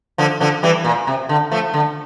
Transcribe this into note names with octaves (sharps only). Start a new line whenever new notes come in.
D3 F3
D3 F3
E3 G3
A#2
C3
D3
F3 A3
D3